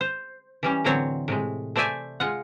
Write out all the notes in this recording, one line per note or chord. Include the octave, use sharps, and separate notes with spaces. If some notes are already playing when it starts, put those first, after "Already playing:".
C5
E3 G3 C#4
A2 D3 E3 F#3 C4 C#5
A2 C3 G#3
A3 C5 D5 E5 G#5 A5
G#3 F4 F#5